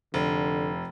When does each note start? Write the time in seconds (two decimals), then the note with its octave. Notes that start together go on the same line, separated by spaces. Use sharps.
0.14 F1 D3